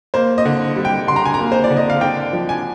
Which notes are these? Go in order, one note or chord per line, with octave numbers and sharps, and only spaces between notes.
A#3 C5
D#5
D3
G3
G5
D3 C6
A#5
G#5
A#3 A#5
C5
D5
D3
D#5
F5
D4 G5
F3
G#5